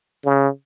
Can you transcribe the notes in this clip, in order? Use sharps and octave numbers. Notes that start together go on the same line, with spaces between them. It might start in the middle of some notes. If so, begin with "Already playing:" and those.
C#3